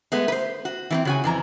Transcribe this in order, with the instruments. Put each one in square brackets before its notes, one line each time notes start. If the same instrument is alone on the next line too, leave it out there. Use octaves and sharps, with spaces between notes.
[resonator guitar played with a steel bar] G#3 A3 B3
B4 C5
F#4
E3 B3 C4
C#3 F#4 G#5
F2 E3 A#5